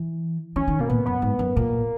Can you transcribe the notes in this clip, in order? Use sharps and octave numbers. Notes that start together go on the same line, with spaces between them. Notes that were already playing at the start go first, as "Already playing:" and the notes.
Already playing: E3
E3 C#4
D#3
B2 A#3
A#2 B3
F#2 B3
G#2
F#2
A#2 A#3